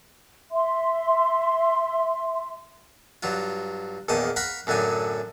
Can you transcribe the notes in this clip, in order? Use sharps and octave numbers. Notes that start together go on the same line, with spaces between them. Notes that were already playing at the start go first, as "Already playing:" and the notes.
E5 C6
G2 F#3 F4
A#1 E2 D#3 A5 D#6
F5 F#5 A#5 B5 C#6
F#2 A2 D3 F#3 G#5